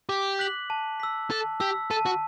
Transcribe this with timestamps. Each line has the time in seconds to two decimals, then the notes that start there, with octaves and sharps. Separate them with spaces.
0.09 G4 D6
0.39 F#6 B6 F#7
0.70 A5
1.00 E6 B6
1.30 A4 A5
1.60 G4 E6 B6
1.91 A4 A5
2.06 F#4